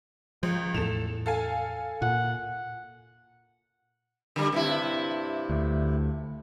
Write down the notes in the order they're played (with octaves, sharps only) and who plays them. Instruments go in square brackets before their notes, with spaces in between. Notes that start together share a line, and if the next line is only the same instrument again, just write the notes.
[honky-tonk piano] C#2 [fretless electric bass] F3
[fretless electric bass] E2 A2 [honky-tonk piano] A4 E7 F7
[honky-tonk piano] A4 F5 G#5
[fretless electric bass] A#2 [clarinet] F#5
[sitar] D3 G3
G2 C3 E4
[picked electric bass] D2